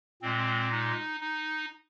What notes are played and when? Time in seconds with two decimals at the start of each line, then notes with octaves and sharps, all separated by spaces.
0.22 A#2 G#3 C4
0.72 D#4
1.21 D#4